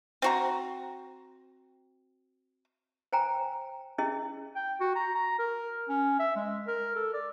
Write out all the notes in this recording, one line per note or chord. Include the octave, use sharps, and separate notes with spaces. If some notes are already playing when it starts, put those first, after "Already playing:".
C4 F#4 A#5
C5 G5 G#5 A#5
C#4 E4 G#4 D#5
G5
F#4
A#5
A#5
A#4
C#4
E5
G#3
A#4
A4
D5